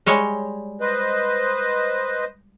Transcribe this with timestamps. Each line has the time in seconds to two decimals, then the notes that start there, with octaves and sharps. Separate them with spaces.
0.06 G3 G#3 C#5
0.81 B4 C5 D#5